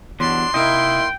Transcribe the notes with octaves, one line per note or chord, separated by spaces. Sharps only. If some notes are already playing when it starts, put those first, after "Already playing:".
E2 G2 B2 F#3 D4 C6
C3 A#3 D#4 E4 D#5 G5